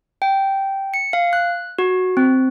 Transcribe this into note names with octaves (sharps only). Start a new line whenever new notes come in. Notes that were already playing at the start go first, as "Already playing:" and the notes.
G5
C#7
F5
F#6
F#4
C4